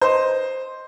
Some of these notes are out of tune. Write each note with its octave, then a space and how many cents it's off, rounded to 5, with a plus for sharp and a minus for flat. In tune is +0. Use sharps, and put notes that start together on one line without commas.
C5 +0 D#5 +0